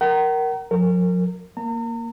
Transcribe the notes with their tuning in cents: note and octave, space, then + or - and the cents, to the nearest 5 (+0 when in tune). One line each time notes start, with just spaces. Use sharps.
A#4 +5 F#5 +45 A#5 +0
F3 +45 A#4 -30
A#3 +0 A#5 -40